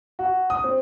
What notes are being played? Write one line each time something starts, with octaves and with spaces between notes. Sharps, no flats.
F#4
D#6
C4